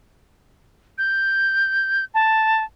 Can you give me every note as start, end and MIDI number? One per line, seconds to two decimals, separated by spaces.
0.98 2.05 91
2.14 2.64 81